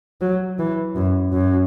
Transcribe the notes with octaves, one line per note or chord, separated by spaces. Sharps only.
F#3
E3
F#2
F#2